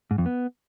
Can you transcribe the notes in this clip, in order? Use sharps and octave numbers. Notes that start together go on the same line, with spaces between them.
G#2
F2
B3